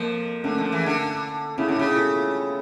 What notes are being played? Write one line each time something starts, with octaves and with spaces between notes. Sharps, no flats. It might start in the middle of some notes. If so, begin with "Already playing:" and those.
Already playing: F2 F3 A#3
D3 A3 C#4
F2 F3
E2 E3
D3
C#3 C#4 E4
D3
C#3 E4 G4
F4 A4